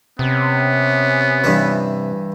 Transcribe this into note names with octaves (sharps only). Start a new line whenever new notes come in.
C3 B3 C#4
G2 E3